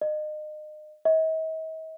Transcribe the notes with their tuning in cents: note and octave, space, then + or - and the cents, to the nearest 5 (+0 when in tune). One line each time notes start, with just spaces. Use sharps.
D#5 -35
D#5 +45